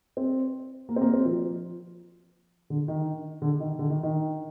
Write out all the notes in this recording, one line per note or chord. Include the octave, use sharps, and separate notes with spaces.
C4
A#3
C4
A#3
C4
F3
D3
D#3
D3
D#3
D3
D#3
D#3